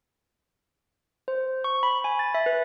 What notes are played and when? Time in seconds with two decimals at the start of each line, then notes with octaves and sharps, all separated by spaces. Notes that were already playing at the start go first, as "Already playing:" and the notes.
1.28 C5
1.64 C#6
1.83 B5
2.04 G#5
2.19 A6
2.34 E5
2.46 B4